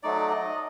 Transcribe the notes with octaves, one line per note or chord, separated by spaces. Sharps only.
F#3 A3 D#4 D5
D#5